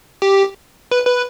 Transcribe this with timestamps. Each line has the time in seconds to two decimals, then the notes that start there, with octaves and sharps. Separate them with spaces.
0.22 G4
0.91 B4
1.05 B4